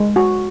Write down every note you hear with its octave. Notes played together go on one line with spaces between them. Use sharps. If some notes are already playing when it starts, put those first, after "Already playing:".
Already playing: G#3
F#4